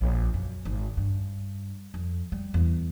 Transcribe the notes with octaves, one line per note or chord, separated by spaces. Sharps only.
A#1
F#2
G#1
G2
F2
G3
E2